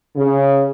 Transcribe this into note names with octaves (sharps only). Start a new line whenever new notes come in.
C#3